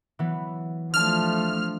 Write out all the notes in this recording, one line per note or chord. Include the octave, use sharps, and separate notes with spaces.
E3 F#3 B3
F3 A3 D4 A5 F6